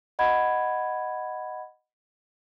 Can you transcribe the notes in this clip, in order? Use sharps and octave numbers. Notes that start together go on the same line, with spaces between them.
D#5 F#5 B5 G#6